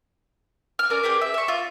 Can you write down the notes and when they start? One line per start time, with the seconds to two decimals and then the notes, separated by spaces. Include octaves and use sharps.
0.79 F6
0.90 C#4 A#4 D5
1.03 G4 G#4 B4
1.21 E5
1.34 E5 C#6
1.48 F4